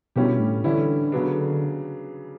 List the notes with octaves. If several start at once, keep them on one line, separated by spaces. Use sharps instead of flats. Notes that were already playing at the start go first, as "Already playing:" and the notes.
B2 D3 G3 C#4 E4 G4
A2
D3 E3 G3 C#4 E4
C#3 F#3 B3 D4